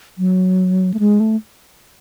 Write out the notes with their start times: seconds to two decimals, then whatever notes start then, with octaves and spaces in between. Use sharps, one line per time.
0.18 F#3
0.94 A3
0.99 G#3
1.20 A3